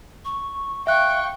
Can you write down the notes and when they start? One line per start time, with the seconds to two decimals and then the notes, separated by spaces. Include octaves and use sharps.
0.25 C#6
0.87 E5 F5 G5 C#6 F#6